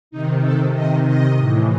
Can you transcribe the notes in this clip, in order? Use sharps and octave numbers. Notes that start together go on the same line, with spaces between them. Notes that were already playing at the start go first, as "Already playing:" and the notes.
C3 D#3 D#4
A4
C3 D#3 D#5
D#5
A2 E3